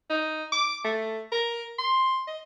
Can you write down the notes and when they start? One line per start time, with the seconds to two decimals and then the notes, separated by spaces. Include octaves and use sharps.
0.10 D#4
0.52 D6
0.84 A3
1.32 A#4
1.79 C6
2.27 D#5